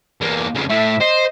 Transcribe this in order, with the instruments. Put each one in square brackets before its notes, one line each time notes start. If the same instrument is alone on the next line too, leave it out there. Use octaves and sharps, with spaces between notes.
[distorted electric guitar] E2 A#3
F2 C#3
[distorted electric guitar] A2 A3 [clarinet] E5
[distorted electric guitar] C5 [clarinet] D#5